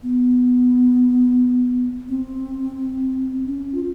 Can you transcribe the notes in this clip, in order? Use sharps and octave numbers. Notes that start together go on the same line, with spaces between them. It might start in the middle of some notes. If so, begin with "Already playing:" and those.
B3
C4
C#4
F4